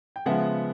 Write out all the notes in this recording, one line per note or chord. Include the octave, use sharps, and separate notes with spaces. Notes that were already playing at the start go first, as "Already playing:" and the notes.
G5
C#3 F3 G#3 B3 E5 F#5